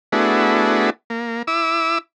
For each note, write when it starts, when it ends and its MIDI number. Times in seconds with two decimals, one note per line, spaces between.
0.12 0.90 57
0.12 0.90 59
0.12 0.90 62
0.12 0.90 64
0.12 0.90 66
0.12 0.90 68
1.10 1.42 58
1.47 1.98 64
1.47 1.98 86
1.47 1.98 88